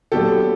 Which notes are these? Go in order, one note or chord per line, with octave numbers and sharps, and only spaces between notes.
A#2 F#3 B3 D4 F#4 G4 A4